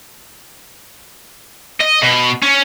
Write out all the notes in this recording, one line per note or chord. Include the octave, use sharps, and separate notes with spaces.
D#5
B2
C#4